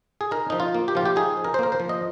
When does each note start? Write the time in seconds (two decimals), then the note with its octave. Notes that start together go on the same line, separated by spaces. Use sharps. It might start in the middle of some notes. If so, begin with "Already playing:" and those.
0.21 G#4
0.31 D#4 A#4
0.50 F3 D#4
0.60 F4
0.75 A#3
0.88 G4
0.95 F3 F4
1.06 G4
1.16 D#4 G#4
1.37 F3
1.44 A#4
1.54 C5
1.59 A#3 A#4
1.72 C5
1.80 F3
1.89 D#5